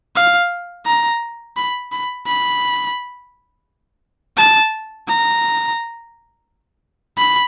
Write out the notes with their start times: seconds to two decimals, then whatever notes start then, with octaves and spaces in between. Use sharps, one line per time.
0.16 F5
0.86 A#5
1.56 B5
1.92 B5
2.27 B5
4.37 A5
5.08 A#5
7.17 B5